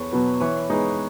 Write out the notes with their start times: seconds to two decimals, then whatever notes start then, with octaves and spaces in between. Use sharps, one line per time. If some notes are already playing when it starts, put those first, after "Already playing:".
Already playing: E2 A4 B4 C#5
0.12 B2 F#3 B3
0.40 E3 B4 C#5
0.70 G#3 B3 D#4